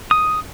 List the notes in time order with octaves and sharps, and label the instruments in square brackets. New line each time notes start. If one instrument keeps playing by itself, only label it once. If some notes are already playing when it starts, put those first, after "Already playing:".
[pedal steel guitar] D#6